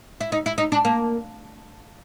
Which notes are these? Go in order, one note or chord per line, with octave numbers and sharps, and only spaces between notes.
E4
D#4
E4
D#4
D4
A#3